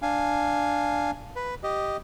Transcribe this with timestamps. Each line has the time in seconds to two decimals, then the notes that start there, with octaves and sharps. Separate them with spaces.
0.02 D4 F5 G#5
1.36 B4
1.63 G4 D#5